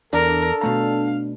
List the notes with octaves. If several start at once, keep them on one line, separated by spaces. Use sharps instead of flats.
E2 D4 A4 A#4
B2 A3 F5 A#5